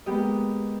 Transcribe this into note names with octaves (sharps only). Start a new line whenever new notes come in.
G#3 A#3 B3 G4 D#5